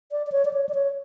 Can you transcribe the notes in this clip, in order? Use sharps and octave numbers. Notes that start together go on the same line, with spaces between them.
D5
D5
C#5
D5
C#5
D5
C#5